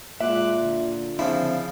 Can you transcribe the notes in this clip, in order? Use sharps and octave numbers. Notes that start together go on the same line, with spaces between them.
A#2 G#3 F4 E5 D6 F#6
D3
C#3 F3 A#3 C4 D4 E4